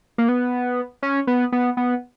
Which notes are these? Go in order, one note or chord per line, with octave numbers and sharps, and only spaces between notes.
A#3
B3
C#4
B3
B3
B3